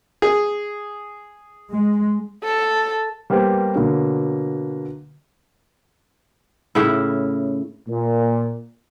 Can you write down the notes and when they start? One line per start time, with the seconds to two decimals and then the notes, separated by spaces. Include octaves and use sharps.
0.22 G#4
1.71 G#3
2.44 A4
3.30 G3 A#3 B3 G4 C5
3.75 B2 D3 F#3 A#3
6.75 A2 C#3 E4
7.89 A#2